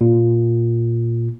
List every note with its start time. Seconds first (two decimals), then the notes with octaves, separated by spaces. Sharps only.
0.01 A#2